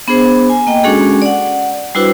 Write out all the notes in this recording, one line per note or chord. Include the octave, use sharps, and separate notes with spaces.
B3 D4 G#4 C5
G#5
A#3 D#5 G5
G#3 C#4 D4 F#4 G#4 A4
D5 F#5
G3 D4 E4 F#4 B4 C5